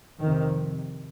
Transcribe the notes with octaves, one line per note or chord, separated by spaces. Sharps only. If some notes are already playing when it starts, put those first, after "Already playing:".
F2 C3 D#3